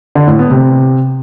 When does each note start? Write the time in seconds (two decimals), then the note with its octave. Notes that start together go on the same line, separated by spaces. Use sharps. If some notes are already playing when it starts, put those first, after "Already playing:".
0.15 D3
0.27 A2
0.39 B3
0.51 C3